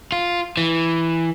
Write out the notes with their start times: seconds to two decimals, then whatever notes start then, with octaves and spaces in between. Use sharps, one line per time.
0.12 F4
0.57 E3